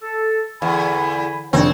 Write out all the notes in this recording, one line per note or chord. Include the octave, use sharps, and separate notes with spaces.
A4
E2 D3 G#5 B5
F1 C4 D4 G#4 C5 C#5